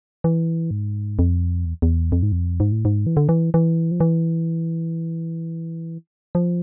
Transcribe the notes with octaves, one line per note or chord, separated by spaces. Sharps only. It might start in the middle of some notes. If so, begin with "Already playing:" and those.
E3
G#2
F2
E2
E2
F2
G#2
F2
G#2
A2
G#2
E3
D3
E3
E3
F3
E3
F3